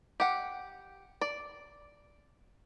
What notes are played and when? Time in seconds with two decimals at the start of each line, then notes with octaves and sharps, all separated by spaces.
0.20 G4 F#5
1.21 D5